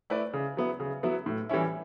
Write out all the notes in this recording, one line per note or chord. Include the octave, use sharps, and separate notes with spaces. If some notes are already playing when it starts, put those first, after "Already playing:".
A3 E4 B4 D5
C#3
F#3 B3 E4
C#3
F#3 B3 E4
A2
E3 G3 C#4 E4